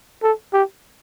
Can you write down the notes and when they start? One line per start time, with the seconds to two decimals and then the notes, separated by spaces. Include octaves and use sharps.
0.23 A4
0.53 G4